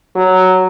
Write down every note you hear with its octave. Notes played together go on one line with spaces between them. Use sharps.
F#3